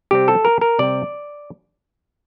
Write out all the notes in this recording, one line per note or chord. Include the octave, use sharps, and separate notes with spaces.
C3 G3 C4 G4
A4
A#4
A#4
C3 G3 C4 D5